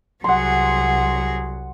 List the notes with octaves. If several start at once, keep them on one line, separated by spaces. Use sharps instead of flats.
C2 F#3 G#4 F#5 C6